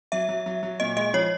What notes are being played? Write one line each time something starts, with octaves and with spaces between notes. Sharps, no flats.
F#3 E5
F#3
F#3
F#3
A#2 D#5
G#3 D#5
F3 C#5